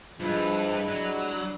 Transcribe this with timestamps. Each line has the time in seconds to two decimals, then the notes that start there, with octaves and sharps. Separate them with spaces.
0.20 G2 F3 G#3 E4 B4
0.88 F#3 G3 D4